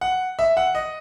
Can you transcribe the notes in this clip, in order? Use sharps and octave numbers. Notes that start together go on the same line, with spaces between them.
F#5
E5
F#5
D#5